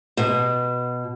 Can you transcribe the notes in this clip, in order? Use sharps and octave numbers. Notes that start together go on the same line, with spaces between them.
B2